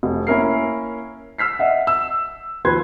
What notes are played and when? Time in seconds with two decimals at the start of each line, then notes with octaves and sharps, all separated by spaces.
0.03 F1
0.27 A#3 C#4 E4 A#4 C7
1.38 E6 F6 B6 C7
1.59 D#5 E5 F#5
1.87 E6
2.65 D#2 F3 B4 C6 G#6